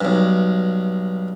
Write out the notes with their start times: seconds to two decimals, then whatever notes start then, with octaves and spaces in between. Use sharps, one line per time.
0.01 B1 G2